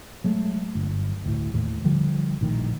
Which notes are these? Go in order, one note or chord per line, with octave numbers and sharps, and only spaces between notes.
F#3 G#3 A3
G1
D2 A2
D#2 A2
D3 F3 G3
A#1 A2 D#3